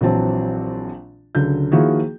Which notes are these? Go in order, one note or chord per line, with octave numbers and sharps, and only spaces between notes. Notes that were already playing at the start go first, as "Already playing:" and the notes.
A#1 E3 F#3 C4 A5
C#2 D3 F#3 G6
D#3 F3 A#3 E4 F#4 G#4